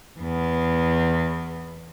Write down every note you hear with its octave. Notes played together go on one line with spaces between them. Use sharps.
E2 B3